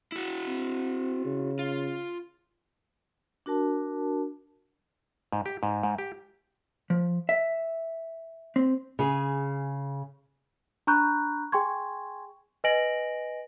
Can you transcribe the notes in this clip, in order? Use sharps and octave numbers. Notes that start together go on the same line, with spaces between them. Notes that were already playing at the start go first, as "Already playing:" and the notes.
E4 F#4
C4
C#3
F4
D4 F#4 A#4 A5
G#2
G4
G#2
G#2
G4
F3
E5
C4
C#3 G#4
D4 A#5 B5 C#6 F#6 G6
G#4 G5 G#5 C6 C#6 G#6
B4 D#5 G#5 A#6 D7 F#7